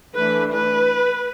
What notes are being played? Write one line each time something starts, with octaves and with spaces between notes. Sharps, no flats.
E3 A3 D4 B4
B4